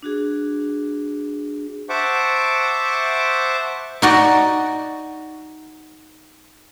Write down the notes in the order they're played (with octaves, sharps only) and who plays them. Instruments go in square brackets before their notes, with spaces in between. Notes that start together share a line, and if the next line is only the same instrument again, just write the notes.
[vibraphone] D4 F#4 G#4
[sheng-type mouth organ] C5 E5 F#5 A5 C#6 D6
[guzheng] D#4 F#4 D5